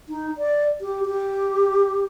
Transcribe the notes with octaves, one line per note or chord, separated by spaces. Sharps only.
D#4
D5
G4
G4